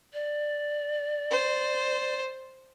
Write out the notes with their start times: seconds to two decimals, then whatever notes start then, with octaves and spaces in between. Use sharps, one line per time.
0.13 D5
1.31 C5